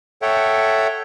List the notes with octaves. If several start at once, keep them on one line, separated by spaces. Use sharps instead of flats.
A4 C#5 E5 F#5 G5